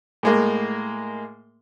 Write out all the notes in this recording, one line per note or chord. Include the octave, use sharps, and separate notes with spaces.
A2 G#3 A#3